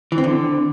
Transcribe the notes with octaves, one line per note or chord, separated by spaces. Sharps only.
E3
C4
D3